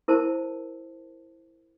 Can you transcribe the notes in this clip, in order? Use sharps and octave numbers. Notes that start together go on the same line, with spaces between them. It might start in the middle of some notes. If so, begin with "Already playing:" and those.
E4 A#4 C5 A5